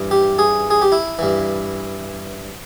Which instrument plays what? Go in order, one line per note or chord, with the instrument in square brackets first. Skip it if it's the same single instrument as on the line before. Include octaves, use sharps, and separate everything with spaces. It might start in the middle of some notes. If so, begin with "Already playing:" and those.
Already playing: [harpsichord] G2 E3
G4
G#4
G#4
G4
E4
G2 E3